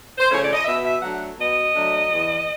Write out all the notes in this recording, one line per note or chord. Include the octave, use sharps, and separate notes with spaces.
C5
C#3 F3 A3 C#4 C#5
D5
D#5
B2 E5
E5
F#3 A3 D4 F#5
B2 D#5
F#3 A3 D4
E2